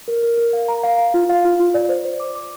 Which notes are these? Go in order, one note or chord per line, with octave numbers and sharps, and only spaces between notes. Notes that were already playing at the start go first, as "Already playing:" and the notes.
A#4
A#4
A#4
F5
A#5
F5
F5
F4
F5
F4
F4
D5
C5
C5
D6
D6